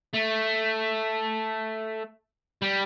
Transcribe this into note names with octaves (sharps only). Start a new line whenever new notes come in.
A3
G3